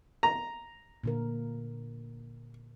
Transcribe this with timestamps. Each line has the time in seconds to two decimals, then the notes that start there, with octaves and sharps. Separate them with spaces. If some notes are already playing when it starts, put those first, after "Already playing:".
0.23 A#5
1.04 A#2 D3 A#4